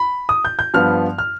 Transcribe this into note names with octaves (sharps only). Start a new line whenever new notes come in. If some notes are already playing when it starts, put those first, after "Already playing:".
Already playing: B5
D#6
G6
G6
G2 F3 B3 F6
F6